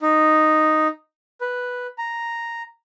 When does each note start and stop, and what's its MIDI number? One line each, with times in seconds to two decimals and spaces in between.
0.01 0.88 63
1.41 1.87 71
1.98 2.62 82